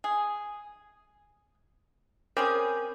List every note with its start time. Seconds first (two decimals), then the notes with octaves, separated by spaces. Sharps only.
0.04 G#4
2.37 C4 C#4 G#4 A#4 D6 G6